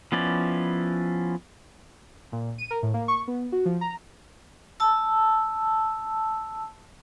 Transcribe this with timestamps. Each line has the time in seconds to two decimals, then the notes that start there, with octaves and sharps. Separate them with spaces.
0.12 F3 B3 C#4 E4 D5
2.32 A#2
2.58 D#7
2.71 A#4
2.83 A2
2.94 A#3
3.08 C#6
3.28 B3
3.52 F#4
3.65 F3
3.81 A#5
4.80 A5 E6